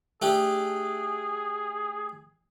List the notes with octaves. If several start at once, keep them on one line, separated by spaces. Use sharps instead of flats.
A3 D4 G4 G#4